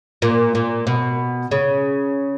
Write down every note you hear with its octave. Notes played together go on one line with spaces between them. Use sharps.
A#2
A#2
B2
C#3